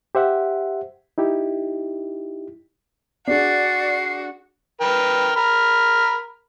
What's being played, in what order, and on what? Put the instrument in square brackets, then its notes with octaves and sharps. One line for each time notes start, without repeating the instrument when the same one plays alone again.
[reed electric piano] G4 C5 E5 F#5
D#4 E4 G4
[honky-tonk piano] D4 G#4 [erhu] F#4 [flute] D5 [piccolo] C7
[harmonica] A#4 B4 G5
A#4 B5